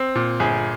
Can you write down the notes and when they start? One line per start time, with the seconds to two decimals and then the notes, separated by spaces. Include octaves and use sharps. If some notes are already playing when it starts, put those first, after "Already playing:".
Already playing: C4
0.15 A#2
0.40 G1 G#4